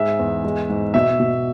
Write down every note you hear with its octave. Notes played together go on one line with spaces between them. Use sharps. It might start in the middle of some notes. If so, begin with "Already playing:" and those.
Already playing: G#2 G#3 E5
E2
G#3
G#2
B2 E5
B2